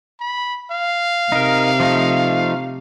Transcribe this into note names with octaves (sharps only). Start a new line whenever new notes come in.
B5
F5
C3 D#4 A#4
F3 A3 D#4